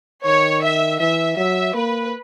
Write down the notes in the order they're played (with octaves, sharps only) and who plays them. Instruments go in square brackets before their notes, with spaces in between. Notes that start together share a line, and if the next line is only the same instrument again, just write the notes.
[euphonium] D#3 [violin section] C#5
[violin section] E5
[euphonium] E3 [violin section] E5
[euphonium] F#3 [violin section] E5
[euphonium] A#3 [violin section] B4